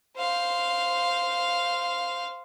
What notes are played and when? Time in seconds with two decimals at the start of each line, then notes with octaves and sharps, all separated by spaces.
0.16 C5 F5